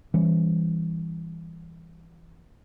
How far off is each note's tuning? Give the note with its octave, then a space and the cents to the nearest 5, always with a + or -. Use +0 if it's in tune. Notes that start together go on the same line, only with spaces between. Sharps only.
E3 +5 G3 +25 C#4 +0